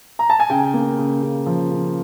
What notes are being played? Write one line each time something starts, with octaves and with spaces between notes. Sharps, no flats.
A#5
A5
G#5
C#3 G5
A#3
C#3
C#3
F3
C#3